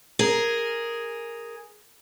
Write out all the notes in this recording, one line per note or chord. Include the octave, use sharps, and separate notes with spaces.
G#4 A#4